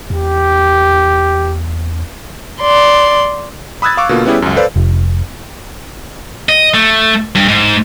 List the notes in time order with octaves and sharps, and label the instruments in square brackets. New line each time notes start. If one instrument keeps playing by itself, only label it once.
[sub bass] E2 [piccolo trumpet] G4
[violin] D5 C6
[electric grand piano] B5 D#6 E6 F#6 G#6 A6
F5 C#6 D6 E6
B2 D3 A#3 F4
G3 B3 C#4 E4 G4 G#4
C#2 F#2
A4 B4 C5 D5 F5
[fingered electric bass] F1
[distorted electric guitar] D#5
A3
G2
G#2